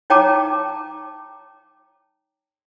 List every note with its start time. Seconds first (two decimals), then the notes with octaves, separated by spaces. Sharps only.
0.10 D#4 C#5 G5 A5 A#5 D6